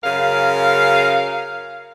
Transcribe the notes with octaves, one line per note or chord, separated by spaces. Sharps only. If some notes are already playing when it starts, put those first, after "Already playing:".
F#2 C#3 A#4 F5